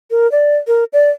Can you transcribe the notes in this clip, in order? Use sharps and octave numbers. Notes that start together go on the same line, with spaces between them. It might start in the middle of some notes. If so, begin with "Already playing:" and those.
A#4
D5
A#4
D5